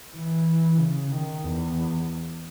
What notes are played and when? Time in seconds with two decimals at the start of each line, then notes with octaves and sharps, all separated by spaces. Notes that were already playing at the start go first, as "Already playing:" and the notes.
0.16 E3
0.80 C#3
1.12 D#3
1.45 E2